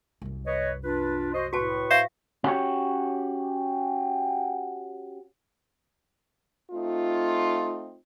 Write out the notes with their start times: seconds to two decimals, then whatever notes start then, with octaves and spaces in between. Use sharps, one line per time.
0.22 C2 F#2
0.46 B4 C#5 D#5
0.83 D4 F4 B4
1.34 F#4 C5 D#5
1.53 A2 F#4 B4 A5 C#6
1.91 C5 E5 F5
2.44 C#4 F#4 G4 C#5
6.72 A3 C4 D#4 F4